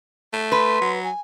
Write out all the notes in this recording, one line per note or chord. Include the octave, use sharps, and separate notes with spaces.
A3
B4 C6
F#3
G#5